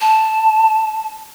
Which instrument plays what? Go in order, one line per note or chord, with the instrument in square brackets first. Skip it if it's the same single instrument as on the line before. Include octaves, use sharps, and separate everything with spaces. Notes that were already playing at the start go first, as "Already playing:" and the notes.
[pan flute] A5